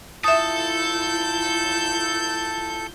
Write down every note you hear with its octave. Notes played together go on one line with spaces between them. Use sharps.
E4 F4 A4 E5 D#6 G6